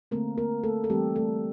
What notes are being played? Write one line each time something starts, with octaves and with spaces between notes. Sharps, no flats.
D3 A3 A#3 C4 A#4
A#3 A#4
A3 A4
A4
E3 G3 A3 C4 G4
A3 A4